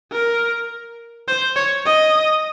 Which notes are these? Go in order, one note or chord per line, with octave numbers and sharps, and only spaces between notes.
A#4
C5
C#5
D#5